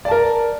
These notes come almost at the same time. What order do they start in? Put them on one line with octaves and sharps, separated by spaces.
D5 A5 A#4